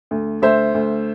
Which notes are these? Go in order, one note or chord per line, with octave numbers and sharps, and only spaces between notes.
D2
D2 C5 E5
D2